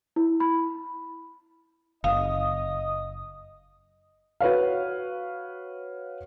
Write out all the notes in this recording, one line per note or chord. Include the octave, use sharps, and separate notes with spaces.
E4
B5
F#1 D#5 F5 D#6
F#4 B4 C#5 F5